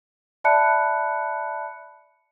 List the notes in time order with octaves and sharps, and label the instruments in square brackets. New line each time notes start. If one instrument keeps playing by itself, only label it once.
[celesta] D5 E5 A5 B5 F#6 C#7